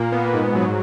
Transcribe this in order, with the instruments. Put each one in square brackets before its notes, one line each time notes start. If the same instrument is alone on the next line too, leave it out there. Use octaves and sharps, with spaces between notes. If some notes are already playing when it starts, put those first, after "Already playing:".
Already playing: [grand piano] A#2 [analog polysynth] A#3
[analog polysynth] B3
G#2
F#3